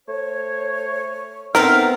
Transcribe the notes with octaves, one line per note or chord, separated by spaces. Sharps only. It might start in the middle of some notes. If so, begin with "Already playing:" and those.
A3 C5 C#5
A3 B3 C4 D#4 A#4 E5 F6